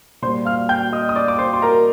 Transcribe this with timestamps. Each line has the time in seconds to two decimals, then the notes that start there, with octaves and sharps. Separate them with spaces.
0.22 A#2 G3 C5 C6
0.45 F5 F6
0.69 G5 G6
0.92 D#5 D#6
1.09 D#6
1.16 D5 D6
1.28 D6
1.39 C5 C6
1.53 C6
1.62 A#4 A#5